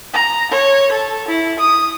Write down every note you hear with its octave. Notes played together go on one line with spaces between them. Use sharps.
A#5
C#5
A4
E4
D#6